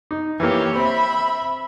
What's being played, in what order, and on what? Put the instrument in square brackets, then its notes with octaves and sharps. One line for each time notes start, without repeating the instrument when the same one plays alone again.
[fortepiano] D#4
[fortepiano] E3 A#3 [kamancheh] G4 C#5
[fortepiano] C4 [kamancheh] E5 B5